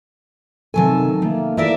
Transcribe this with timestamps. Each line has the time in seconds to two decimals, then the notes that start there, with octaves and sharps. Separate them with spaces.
0.74 C3 D#3 F#3 A4 G#5
1.22 D#3 A3 A#3
1.57 E3 G#4 A#4 D5 E5